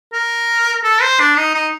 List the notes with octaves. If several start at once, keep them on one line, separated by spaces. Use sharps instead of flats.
A#4
A4
C5
D4
D#4
D#4